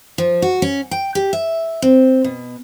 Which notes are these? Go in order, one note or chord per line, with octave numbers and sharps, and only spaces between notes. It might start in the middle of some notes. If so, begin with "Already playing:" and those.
F3
F#4
C#4
G5
G4
E5
C4
B2